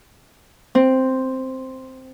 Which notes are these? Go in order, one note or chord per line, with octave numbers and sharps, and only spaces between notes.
C4